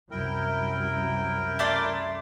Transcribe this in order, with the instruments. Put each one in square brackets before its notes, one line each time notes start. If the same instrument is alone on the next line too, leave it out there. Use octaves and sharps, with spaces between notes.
[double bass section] C2 F#2 [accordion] E4 A#4 G5
[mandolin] A3 D5 C6